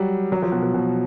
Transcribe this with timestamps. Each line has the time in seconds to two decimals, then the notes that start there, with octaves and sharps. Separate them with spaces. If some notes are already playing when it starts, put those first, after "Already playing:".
Already playing: F#3 G3
0.32 F#3
0.42 F3
0.52 B2
0.62 B2
0.74 B2